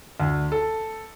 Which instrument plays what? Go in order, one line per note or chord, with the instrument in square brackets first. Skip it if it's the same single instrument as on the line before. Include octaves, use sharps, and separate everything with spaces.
[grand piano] D2
A4